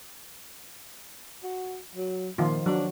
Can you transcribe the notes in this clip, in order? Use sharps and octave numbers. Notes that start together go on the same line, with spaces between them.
F#4
F#3
A#2 D#3 F3 F4
F#3 D4